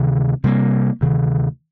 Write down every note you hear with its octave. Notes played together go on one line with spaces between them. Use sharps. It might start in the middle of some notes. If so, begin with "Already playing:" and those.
Already playing: D2 C3 D#3
C3 G3 A#3
D2 C3 D#3